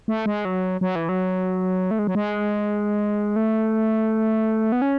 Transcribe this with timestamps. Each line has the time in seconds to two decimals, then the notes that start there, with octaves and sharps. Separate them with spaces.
0.08 A3
0.26 G#3
0.45 F#3
0.81 F#3
0.96 E3
1.09 F#3
1.91 A3
1.99 G#3
2.07 F#3
2.15 G#3
3.36 A3
4.72 B3
4.82 C#4